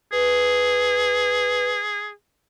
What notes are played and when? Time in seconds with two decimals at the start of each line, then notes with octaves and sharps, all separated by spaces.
0.13 G#4 B4